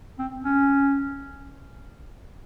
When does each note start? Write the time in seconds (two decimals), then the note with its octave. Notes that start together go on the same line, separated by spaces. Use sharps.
0.19 C4
0.45 C#4